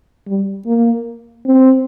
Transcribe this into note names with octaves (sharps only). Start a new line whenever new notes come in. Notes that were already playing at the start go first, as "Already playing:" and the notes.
G3
A#3
C4